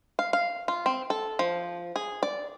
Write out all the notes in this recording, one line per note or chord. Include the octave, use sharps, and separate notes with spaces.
F5
F5
F4
C4
A4
F3
G#4
D5